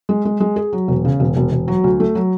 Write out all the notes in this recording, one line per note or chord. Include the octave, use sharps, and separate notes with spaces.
G#3
G#3
G#3
G#4
F#3
E1
C#3
E1
E1
E1
F#3
D2
A3
F#3